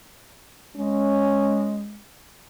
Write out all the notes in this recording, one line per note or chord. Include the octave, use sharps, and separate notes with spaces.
G#3 C#4